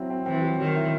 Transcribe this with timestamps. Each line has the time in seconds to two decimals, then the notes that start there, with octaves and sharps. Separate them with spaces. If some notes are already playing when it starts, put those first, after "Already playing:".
Already playing: F#3 C4 E4
0.10 C4
0.26 E3 C4
0.42 F#3
0.58 D#3 F#3
0.75 E4